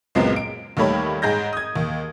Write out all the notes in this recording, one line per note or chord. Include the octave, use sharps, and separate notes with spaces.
C#2 F#2 A#2 G#3 B3 C4
D7
D#2 D#3 G3 A3 C#5 B5
G#2 G#4 G6 A#6
D#6 G#6
D#2